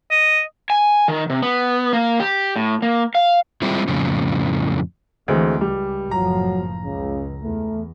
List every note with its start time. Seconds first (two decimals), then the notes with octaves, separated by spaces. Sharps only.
0.11 D#5
0.70 G#5
1.08 D#3
1.30 C3
1.43 B3
1.93 A#3
2.20 G4
2.56 A2
2.82 A#3
3.15 F5
3.62 G3 G#3 C4 E4 F4
3.87 F2 A2 C#3
5.28 D2 E3 G#3 C4
5.61 C#2 G3
6.11 F#1 A2 F3 F#3 A#5
6.85 C#2 C#3
7.43 E2 A3